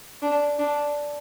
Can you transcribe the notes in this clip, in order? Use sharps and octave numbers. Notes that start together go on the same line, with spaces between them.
D4
D4